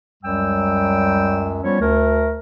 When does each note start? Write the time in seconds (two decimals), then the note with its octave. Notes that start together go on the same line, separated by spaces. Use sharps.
0.23 C#2 F#2 F#3 G3 G5 E6
1.62 F3 G3 B3 C#4 F4 C#5
1.80 D2 A3 A#4